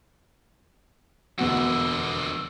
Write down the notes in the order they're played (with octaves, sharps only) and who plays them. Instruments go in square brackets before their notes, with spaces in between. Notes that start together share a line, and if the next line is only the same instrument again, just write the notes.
[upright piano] E1 B2 F#4 [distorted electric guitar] F2 D3